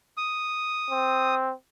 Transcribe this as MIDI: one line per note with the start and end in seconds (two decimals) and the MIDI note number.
0.17 1.35 87
0.90 1.53 60